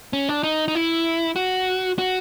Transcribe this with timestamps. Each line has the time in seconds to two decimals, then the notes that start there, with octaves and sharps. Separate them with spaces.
0.13 C#4
0.29 D4
0.43 D#4
0.68 D#4
0.75 E4
1.36 F#4
1.98 F#4